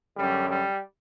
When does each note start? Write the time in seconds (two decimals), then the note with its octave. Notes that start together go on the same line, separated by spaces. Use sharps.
0.16 F#2 D3 G3
0.50 G3